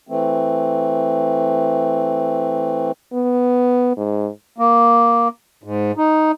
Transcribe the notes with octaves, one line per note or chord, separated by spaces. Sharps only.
E3 A3 C4
B3
G#2
A#3
G#2
D#4